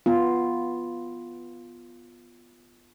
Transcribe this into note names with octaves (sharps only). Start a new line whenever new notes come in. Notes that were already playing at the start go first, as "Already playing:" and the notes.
B3 F4